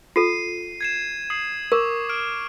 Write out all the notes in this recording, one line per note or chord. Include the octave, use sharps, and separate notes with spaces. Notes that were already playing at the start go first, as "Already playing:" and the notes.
F4 A4 C7 D#7
G#6 C7 E7
D#6 C7
A#4 C#6 D6
F6 D7